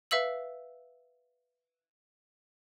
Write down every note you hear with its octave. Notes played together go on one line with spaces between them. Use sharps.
B4 E5 F5 E6 F#7